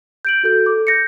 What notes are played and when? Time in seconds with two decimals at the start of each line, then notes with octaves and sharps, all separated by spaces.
0.25 G6 D7 F#7
0.43 F#4 A4 G6
0.66 A4 D6
0.87 G6 A#6 C#7